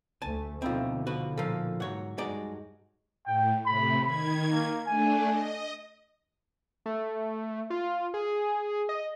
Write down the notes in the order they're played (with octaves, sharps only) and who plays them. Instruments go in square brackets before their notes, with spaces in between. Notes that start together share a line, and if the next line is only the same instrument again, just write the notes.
[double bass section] D2 A3 [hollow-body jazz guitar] G#5 A5
[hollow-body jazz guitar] D2 C4 [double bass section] B2 D3 [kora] F3 D#4 E4
[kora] F3 [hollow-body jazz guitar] F#4 B4
[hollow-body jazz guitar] A#2 F3 [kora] A4 A#4 F5
[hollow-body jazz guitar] G#2 C#5 [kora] F#3 F#5
[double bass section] G2 [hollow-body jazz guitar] G#3 D5 [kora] D#4 F#4
[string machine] A2 [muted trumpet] G5
[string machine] A2 C3 [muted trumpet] B5
[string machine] D#3 G#6 [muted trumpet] B5
[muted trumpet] A#3
[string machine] A3 D4 [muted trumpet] G#5
[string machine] D#5
[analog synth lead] A3
F4
G#4
D#5